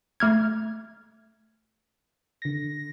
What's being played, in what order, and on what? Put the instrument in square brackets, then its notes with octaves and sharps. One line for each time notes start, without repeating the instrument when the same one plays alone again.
[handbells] A3 F6 G#6
[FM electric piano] D3 A#6